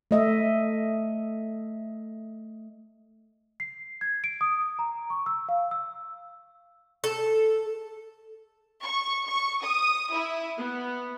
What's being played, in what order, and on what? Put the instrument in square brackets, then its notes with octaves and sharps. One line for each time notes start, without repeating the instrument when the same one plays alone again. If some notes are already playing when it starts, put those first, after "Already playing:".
[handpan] A3 D#5 E5
[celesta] C7
G#6
D7
D#6
A#5
C#6
E6
F5
E6
[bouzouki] A4
[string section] C#6
C#6
D#6
E4
B3